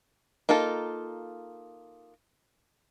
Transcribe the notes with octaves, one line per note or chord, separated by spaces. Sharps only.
A#3 D#4 F4 A4